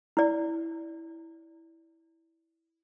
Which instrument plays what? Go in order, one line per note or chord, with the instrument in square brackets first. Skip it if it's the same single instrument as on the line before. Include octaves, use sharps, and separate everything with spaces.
[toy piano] E4 D5